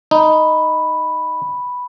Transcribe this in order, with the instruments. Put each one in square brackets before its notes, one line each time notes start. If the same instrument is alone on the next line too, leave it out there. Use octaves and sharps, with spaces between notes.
[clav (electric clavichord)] D#4 [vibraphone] B5